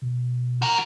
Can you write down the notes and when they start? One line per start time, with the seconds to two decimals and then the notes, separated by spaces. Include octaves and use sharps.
0.02 B2
0.62 F#4 A#4